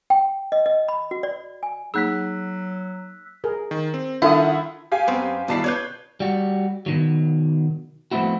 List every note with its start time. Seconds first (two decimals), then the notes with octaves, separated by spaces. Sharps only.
0.10 G5
0.52 D#5
0.66 D#5
0.88 B5
1.11 F#4
1.23 D5
1.63 G#5
1.94 F#3 A#3 D#4 G#4 E6 F#6 B6
3.44 G#4 A#4
3.71 D#3
3.94 C4
4.22 D#3 D4 E4 F4 A4 E5 F#5 D#6
4.92 G4 F5 G#5
5.08 F#2 B3 C4
5.48 B2 D#3 G3 E4 A5 C7
5.64 B4 C#5 D5 G6 G#6
6.20 G3 F#4
6.86 B2 D#3 F#3
8.11 F3 A3 B3 C4 E4 F#4